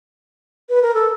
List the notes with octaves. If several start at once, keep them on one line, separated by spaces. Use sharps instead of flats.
B4
A#4
A4